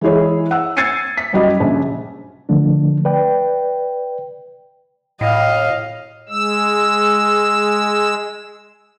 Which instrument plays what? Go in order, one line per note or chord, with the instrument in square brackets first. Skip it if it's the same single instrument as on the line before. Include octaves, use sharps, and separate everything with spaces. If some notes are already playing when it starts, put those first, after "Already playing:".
[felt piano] E3 G#3 E4 G#4 C#5
F#5 E6
E6 G#6 A6 C7 C#7 D#7
B6
F#2 F#3 G3 F#4 D#5
A#1 C#3
[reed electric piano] D3 F3 A3 D4
B4 D5 G5
[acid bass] A2 [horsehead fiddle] D#5 F5
[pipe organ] G#3 E6